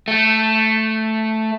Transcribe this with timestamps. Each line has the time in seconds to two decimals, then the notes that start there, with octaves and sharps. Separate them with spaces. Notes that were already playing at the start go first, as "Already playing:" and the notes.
0.08 A3